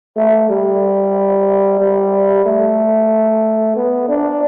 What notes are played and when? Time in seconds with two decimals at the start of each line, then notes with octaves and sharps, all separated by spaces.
0.17 A3
0.49 G3
1.79 G3
2.46 A3
3.76 B3
4.09 D4